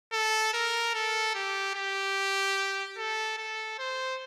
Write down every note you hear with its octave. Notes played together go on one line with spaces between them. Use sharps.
A4
A#4
A4
G4
G4
A4
A4
C5